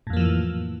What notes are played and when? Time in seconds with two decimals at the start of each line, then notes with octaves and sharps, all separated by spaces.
0.07 A2
0.10 F2
0.13 A#3
0.17 F3
0.20 E3